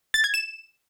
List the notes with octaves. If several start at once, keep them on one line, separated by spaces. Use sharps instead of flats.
A6
G#6
E7